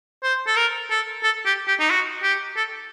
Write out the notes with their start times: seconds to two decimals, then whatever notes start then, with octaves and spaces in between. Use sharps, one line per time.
0.23 C5
0.47 A4
0.56 A#4
0.90 A4
1.23 A4
1.46 G4
1.68 G4
1.80 D#4
1.90 F#4
2.23 G4
2.56 A4